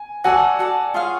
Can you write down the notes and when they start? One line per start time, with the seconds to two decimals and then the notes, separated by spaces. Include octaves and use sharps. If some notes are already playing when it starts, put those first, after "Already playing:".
Already playing: G#5
0.24 F#4 A4 D5 F#5 G#5
0.59 F#4 A4 D5
0.94 F4 G#4 C#5 F5